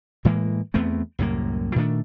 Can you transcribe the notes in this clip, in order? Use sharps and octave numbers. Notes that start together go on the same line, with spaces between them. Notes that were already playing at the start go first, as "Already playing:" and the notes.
A2 E3 G#3 A#3
E2 A3 B3 C4
C2 F#2 A2 A#3
A#2 D#3 A3 D4